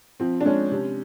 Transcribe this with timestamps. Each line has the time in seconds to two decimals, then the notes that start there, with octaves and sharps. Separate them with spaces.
0.20 F3 C4
0.41 D4
0.45 G#3 C#4
0.71 C3